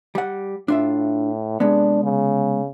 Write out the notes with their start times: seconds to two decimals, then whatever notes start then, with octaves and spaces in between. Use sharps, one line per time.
0.15 G3 F#5
0.68 A2 D4 F4 E5
1.60 C3 G#3 B3 D4
2.04 C#3